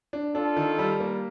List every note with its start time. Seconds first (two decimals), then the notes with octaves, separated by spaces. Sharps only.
0.13 D4
0.35 D4 F4 A4
0.57 D#3
0.79 G3
1.00 A#3